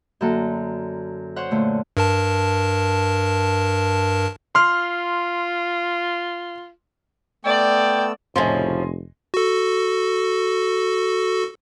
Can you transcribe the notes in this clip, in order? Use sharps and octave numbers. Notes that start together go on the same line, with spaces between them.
F#2 D3 A#3 F#4 A4
C5 C#5 F#5
A#2 D3 A3
G2 A#4 A5
F4 C6 F6
A3 B3 D5 G5 E6
F1 A2 C#3 F3 D#5 G#5 C6
F#4 A4